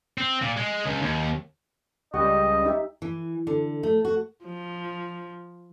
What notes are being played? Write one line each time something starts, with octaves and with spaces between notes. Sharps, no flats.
C4
A#2
G#3
C#2
D#2
C#2 G3 G4 D#5 F#5 C#6
D#4 G4 E5
E3
D3
A3
F#4
F3